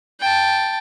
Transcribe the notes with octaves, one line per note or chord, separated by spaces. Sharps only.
G5 A5